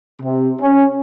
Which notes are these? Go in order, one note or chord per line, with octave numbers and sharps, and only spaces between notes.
C3
C#4